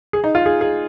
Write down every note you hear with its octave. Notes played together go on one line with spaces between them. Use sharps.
G#4
D#4
F4
G#4
G#4